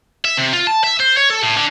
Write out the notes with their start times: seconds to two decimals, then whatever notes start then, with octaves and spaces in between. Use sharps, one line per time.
0.25 E5
0.37 C3
0.53 F4
0.67 A5
0.84 E5
1.00 C5
1.17 C#5
1.30 A4
1.43 A2
1.56 D3